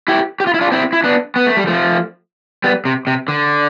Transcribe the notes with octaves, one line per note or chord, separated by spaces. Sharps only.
E4 G4
G4
F4
E4
D4 F4
C4 E4
E4
B3 D4
B3
A3
G3
F3 A3
G3 B3
C3
C3
D3